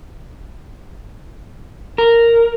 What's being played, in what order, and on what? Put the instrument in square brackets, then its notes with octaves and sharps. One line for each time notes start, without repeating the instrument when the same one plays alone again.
[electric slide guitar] A#4